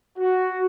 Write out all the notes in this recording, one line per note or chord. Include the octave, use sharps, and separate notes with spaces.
F#4